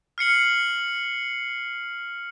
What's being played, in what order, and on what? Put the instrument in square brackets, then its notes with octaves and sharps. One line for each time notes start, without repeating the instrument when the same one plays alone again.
[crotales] F6 C7 C#7 F#7